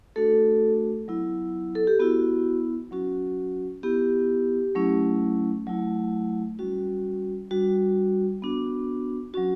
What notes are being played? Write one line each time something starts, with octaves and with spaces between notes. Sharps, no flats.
A3 D4 F#4 A4
F#3 B3 E4
A4
G4
B3 E4 F#4
F#3 C#4 F#4
B3 E4 G4
F#3 A3 C#4 E4
F#3 A3 E4
G3 C#4 F#4
G3 D4 F#4
B3 D4 F#4
F#3 C#4 F#4